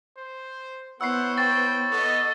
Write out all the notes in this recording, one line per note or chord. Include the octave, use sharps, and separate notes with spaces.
C5
B3 E4 C5 C#5 F#5 E6 C7
G5 C#6 A6
B3 A4 D#5